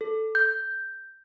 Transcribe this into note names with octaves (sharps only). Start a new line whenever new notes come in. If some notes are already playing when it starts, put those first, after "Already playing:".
A4
G6